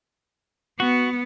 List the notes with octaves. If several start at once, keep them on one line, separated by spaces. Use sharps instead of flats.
B3 F#4